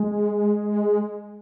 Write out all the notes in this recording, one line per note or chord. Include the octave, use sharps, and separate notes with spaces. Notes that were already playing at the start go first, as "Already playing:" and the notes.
Already playing: G#3